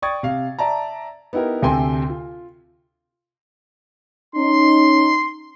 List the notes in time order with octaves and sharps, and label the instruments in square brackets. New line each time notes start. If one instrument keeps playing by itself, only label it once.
[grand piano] D5 G5 C#6 D#6 G#6 A6
C3 F5
D5 E5 A5 A#5
B3 D#4 E4 G4 A#4
D2 C3 A4 G5 G#5 C6
F4
[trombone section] C#4 D#4 [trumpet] C6